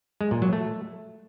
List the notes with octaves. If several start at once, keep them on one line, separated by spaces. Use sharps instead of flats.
G#3
A#2
F#3
A3